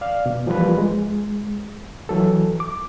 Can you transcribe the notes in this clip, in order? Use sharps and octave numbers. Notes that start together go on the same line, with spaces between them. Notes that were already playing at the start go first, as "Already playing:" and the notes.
D5 F5
B2
E3 F3 G3 A#3 F4 B4
G#3
E3 F#3 A4
D6